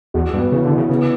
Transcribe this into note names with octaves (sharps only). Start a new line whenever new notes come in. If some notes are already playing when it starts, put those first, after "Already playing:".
E2 F#4
G2 B3
C#3 E3
D3
E3
C#3
C#3 B3